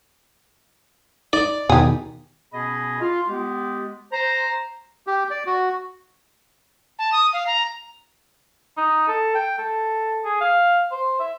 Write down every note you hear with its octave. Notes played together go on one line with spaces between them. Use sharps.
D#4 D5
E2 B2 D#3 D#4 G4 G#4
B2 B3 C#4 G#4 D#5 B5
F4
G#3 B3 G4
C5 A#5
G4
D5
F#4
A5
D#6
F5
A#5
D#4
A4
G5
A4
G#4
F5
C5
E5